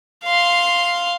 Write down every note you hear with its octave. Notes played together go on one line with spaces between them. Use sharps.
F5 C6